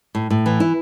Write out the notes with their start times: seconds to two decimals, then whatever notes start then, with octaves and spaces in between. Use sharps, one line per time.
0.15 A2
0.30 A2
0.46 E3
0.60 E4